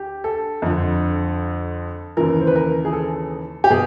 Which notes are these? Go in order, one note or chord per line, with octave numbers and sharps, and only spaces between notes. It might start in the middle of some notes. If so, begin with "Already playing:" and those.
Already playing: D2 G4
A4
F2 D3
D#2 C#3 E3 A#4
C5
B4
A#4
G#4
A4
G4
B2 G#4